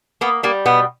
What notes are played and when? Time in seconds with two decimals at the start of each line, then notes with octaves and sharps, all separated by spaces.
0.21 A#3 B3
0.43 G3 A#3
0.66 B2 B3